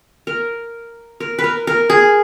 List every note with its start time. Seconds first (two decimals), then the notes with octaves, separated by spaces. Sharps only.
0.27 A#4
1.20 A#4
1.39 B4
1.44 A#4
1.67 A#4
1.90 G#4